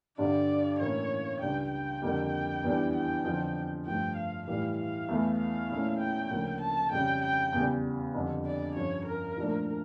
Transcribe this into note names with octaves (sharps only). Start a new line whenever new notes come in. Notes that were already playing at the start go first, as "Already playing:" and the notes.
G2 D3 G3 D4 D5
A2 E3 A#3 C#4 E4 C#5
C#2 C#3 G3 D4 G5
G5
F2 D3 G3 A#3
E2 E3 G3 D4
G5
F2 D3 F3
G2 F3 A3 G5
F5
A2 E3 G3 F5
F5
E2 E3 A3 E4
F5
A#2 A3 C#4 E4
G5
D2 C#3 F3 A#3 C#4
A5
F2 C#3 G3 C#4 G5
G5
E2 C#3 G3
F2 D3 G3 D4
D5
G2 F3 C#4 C#5
A#4
A#2 F3 A3 D4